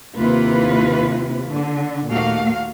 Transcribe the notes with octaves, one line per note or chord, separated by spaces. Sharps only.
D#2 C3 A#3 E4 F4 B4
D3
D#2 A#2 A3 A#3 F#4 F5